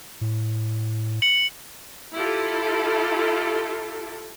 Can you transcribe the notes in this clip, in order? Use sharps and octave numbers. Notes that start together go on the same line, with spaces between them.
A2
C#7 F#7
E4 F4 G4 A4